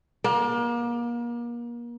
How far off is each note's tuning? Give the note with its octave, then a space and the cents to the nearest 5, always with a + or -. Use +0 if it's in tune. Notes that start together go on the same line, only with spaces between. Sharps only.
A#3 +35